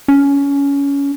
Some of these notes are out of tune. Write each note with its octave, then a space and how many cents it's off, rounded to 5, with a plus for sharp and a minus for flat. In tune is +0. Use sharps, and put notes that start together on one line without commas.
C#4 +20